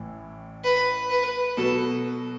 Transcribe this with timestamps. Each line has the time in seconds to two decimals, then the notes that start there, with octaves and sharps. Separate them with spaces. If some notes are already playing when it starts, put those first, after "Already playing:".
Already playing: A1 A2 E3
0.64 B4
1.10 B4
1.57 B2 F#3 B3 F#4 A4